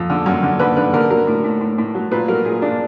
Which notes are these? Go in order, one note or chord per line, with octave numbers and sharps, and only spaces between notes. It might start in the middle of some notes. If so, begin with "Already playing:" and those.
Already playing: F2
D3
F#2
D3
D3 B4
D3 B4
D3 A#4
F#3 A#4
A2
A2
A2
A2
F#3
A#2 B4
F#3 A#4
A#2 G#4
A#2 D4